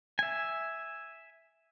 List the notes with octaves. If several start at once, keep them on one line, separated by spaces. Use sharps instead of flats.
E5 G#5